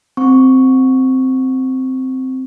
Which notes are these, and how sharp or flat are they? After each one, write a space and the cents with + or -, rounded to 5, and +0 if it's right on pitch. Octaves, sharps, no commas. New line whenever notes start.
C4 -5 C#6 +0